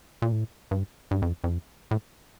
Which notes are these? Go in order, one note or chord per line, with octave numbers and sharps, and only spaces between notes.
A#2
A2
G2
G2
F2
F2
A2